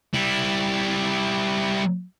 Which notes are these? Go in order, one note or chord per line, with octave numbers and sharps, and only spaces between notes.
G3 E4